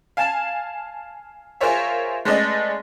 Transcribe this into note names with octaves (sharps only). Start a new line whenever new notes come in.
F5 G#5 A5
F4 G#4 A#4 C5 C#5 E5
G#3 A3 C#4 B4 D5 D#5